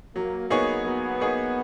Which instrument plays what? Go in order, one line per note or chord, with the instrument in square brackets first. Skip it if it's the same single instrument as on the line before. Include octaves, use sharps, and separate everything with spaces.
[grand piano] F#3 [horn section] A#3
[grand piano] A#3 D#4 G#4 C#5 [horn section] B3
[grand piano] F#3 [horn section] B3
[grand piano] A#3 D#4 G#4 C#5